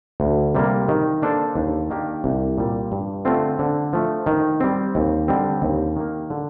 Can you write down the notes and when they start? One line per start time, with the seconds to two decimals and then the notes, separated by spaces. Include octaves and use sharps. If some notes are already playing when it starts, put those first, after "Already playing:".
0.20 D2
0.55 C3 G3 A#3
0.88 D#3
1.22 A#3 D4 A4 C5
1.55 D#2
1.90 D#3 A#3 D4 G4
2.24 C2
2.58 A#2 G3
2.92 G2
3.25 D3 A3 C4 F4
3.59 D3
3.93 F3 A3
4.26 D#3
4.61 G3 C4
4.95 D#2
5.28 D3 G3 C4
5.62 D#2
5.96 D#3 A#3
6.30 D3